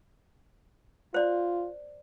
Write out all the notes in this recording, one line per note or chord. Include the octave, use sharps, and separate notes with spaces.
F4 C5 D5